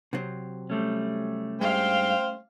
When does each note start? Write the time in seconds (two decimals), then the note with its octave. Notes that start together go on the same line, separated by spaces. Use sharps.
0.13 C3 F#3 C4
0.70 G3 A3 C#4
1.61 G2 G#3 C5 F5 G5